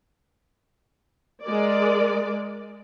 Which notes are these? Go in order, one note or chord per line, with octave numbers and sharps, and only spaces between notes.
G#3 A#4 D5